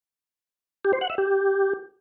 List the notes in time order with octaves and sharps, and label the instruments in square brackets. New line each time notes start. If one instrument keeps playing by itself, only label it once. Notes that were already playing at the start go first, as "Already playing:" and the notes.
[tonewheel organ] G4
C5
F#5
E5
G4